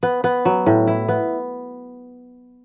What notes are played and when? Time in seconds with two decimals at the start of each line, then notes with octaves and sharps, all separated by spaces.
0.03 B3
0.24 B3
0.45 F#3
0.66 A2
0.87 E4
1.08 B3